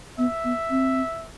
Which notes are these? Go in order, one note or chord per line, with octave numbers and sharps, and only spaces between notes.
B3 E5
B3
C4